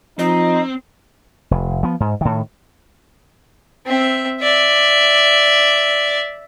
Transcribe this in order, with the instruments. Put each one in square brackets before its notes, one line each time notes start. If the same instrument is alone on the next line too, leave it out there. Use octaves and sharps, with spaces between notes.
[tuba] F3 [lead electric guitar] C4 [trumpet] D#4 [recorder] D#5
[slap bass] F1
F3 B3
G#2
A2 D#3
[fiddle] C4 E5
D5 E5